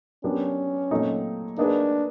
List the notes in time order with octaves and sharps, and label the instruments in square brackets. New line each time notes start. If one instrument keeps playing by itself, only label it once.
[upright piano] F#3 B3 D4 G4 A#4 [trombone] C#4
[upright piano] A#2 F#3 A3 C4 D#4
[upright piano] A#3 D#4 G#4 B4 [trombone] D4